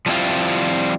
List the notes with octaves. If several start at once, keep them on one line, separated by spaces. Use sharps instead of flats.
F3 G3 C4 E4 F4